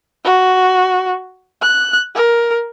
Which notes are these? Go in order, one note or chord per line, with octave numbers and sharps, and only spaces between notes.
F#4
F#6
A#4